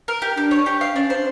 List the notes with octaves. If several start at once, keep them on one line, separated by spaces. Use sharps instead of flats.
A#4
G4
D4 G4
C#5
G4
F5
C#4 D4
C5